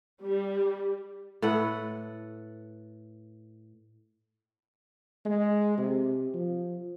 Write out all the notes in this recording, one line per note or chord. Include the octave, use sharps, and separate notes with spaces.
G3
A2 A4 B4 F#5
G#3
C3
F3